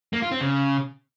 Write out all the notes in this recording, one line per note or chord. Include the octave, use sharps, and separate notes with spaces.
A#3
F4
C4
C#3